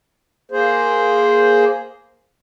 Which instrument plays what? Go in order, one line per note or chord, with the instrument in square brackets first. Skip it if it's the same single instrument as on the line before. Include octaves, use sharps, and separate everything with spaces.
[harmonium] A#3 G#4 C5